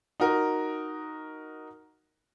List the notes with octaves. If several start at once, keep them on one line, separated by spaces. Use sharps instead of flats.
D#4 F#4 A#4